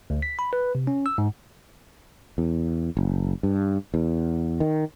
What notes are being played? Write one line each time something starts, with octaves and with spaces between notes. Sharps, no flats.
D2
B6
B5
B4
C3
C#4
E6
G#2
E2
F#1
G2
E2
D#3